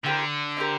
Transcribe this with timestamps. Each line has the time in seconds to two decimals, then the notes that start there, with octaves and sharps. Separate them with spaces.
0.03 D3 C4 E4 G4 A#4
0.57 C4 E4 G4 A#4